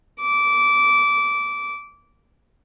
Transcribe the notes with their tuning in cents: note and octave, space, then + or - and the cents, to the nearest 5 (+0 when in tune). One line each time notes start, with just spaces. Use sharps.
D6 -20